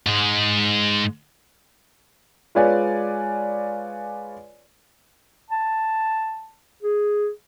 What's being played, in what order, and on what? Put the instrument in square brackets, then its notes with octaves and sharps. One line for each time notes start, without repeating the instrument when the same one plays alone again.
[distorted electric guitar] G#2 G#3
[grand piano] G#3 F4 B4 C#5 D5 G#5
[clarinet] A5
G#4